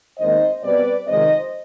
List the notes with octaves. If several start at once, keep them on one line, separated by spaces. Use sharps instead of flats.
D#2 D#3 G#3 C4 C5 D#5
B2 G3 C4 B4 D5
F2 C3 D#3 G#3 C4 C5 D#5